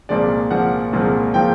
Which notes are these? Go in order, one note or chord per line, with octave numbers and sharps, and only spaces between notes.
C2 A#2 F3 G#3 D5
C2 A#2 F3 G#3 F#5
C2 A#2 F3 G#3
A#2 F3 G#3 G5